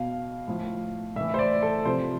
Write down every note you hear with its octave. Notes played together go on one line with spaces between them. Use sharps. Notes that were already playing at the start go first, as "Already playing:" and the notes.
Already playing: B2 F5
A2 F3
A2 E3 E5
C5
D5
A4
C3 F3 C5